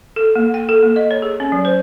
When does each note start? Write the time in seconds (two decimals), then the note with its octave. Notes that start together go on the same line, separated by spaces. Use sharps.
0.16 A4
0.35 A#3
0.54 G5
0.69 A4
0.83 A#3
0.96 D#5
1.11 C#5
1.22 G#4
1.40 C#4
1.52 F#3
1.65 C5